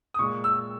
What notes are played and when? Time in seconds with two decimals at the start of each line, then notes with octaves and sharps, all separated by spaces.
0.14 D#6
0.19 A#2 G#3 C#6
0.44 E6